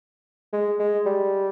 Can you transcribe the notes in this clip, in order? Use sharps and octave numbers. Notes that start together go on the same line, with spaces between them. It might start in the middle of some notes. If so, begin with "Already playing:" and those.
G#3
G#3
G3